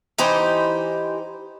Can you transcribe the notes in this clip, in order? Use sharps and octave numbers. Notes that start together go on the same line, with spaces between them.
E3 D#4 G4 C5